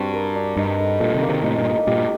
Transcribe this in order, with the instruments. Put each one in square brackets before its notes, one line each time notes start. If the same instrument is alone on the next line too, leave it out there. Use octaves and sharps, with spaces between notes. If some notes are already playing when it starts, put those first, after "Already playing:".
Already playing: [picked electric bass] G2 [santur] C4 F#4
[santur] A#4
D4
[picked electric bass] G2 [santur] D#4
[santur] A4
[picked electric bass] G2 A#2 [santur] A4
[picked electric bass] C3 D#3
[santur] A#3
[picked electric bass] C3 D#3
[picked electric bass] A2 C3 [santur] D#5
[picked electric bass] G2 A#2
[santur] D#4
[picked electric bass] G2 A#2 [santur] G4